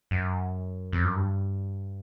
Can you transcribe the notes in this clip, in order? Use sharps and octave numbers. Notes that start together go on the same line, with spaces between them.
F#2
F2
F#2
G2